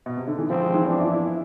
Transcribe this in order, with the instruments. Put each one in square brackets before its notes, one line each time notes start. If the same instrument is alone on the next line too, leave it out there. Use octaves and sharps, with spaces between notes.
[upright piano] B2
C3
D3
E3
[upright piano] F3 [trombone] C4
[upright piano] G#3
E3
[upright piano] F3 [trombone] D4
[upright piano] E4
E4